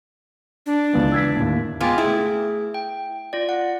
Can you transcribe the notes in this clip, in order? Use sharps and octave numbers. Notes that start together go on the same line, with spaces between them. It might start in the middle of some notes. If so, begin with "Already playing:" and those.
D4
C#2 E3
E6 G#6 B6
D#2 A2
G#3 B3 F4 G5 D6 F6
A3 E4 G#4
G5
F4 D5
F#5